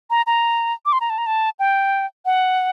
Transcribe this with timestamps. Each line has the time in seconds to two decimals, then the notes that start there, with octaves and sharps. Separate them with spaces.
0.10 A#5
0.27 A#5
0.86 D6
0.93 C6
1.01 A#5
1.10 A5
1.18 A#5
1.26 A5
1.59 G5
2.25 F#5